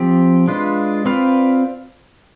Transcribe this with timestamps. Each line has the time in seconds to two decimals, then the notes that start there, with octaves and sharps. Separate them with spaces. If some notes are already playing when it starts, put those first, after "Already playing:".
Already playing: F3 C4 G4
0.48 G#3 D4 F4 B4
1.05 C4 F4 B4 D5 F5